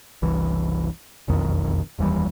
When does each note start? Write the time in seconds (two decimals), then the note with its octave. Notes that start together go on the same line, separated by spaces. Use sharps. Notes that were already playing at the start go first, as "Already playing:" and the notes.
0.22 F#1 C2 E3
1.28 E1 B1 F2 D#3
1.98 F1 D#2 E3 G3